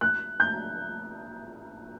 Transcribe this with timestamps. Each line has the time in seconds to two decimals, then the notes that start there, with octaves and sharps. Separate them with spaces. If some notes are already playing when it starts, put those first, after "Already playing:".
0.01 F#6
0.40 G6